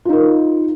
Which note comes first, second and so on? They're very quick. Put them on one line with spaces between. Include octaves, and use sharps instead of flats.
F4 D#4 A#4